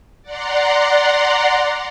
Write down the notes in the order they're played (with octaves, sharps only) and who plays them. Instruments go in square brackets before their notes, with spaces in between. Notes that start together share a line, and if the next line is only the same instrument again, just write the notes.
[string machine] D5 F#5 A#5 C6